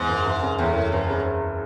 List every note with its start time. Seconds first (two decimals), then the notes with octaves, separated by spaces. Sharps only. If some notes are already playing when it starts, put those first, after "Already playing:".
Already playing: E2 G#2
0.09 F#1
0.26 F#1
0.43 C#3
0.58 E2 A2
0.76 F#1
0.92 F#1 G#2
1.10 C#3